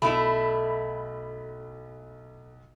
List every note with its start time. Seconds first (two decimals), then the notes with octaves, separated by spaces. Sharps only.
0.02 B1 A3 E4 B5 E7